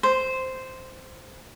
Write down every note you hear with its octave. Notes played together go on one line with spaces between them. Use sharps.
C5